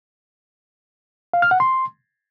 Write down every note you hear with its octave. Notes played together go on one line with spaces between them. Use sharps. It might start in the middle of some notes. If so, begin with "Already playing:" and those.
F5
F6
F#5
C6